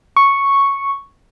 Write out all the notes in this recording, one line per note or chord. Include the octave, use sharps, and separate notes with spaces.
C#6